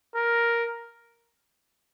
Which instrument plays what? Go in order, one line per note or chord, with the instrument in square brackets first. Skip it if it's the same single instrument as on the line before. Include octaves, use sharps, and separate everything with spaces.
[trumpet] A#4